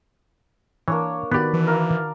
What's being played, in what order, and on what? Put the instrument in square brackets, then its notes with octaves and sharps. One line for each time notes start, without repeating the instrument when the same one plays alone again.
[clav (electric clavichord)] E3 [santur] A#3 D4 C#5
[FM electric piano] D#3 F#4 [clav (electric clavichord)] B3 G4 [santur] B4 D5
[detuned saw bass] E3
[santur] A#4 F5